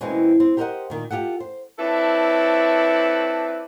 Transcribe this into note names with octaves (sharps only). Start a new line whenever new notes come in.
B2 E3 G#3 A#3 C4 C#4
C4
G4 A#4 C5 C#5 D#5 F#5
A#2 D#3
F4 G4 A4 F#5
C5
C4 D4 E4 A4 B4 C#5